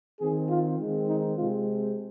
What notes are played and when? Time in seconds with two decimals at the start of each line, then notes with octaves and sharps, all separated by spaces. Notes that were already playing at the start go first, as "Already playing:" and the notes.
0.20 D#3 C4 G#4
0.49 F4
0.78 D#3 G#3 C4
1.08 D#4
1.36 C3 G#3 C4 F4